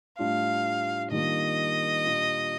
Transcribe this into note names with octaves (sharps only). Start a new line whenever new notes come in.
A2 G3 D4 F4 F5
D#3 G3 A#3 D4 F4 D#5
A#2 G3 D4 F4